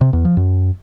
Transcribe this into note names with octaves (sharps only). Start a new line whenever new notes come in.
C3
E2
F3
F#2